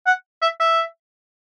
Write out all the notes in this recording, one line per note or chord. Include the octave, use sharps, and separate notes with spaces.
F#5
E5
E5